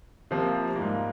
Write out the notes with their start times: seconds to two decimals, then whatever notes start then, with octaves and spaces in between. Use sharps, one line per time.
0.31 C3 F3 A#3
0.75 G#2 G3 A#3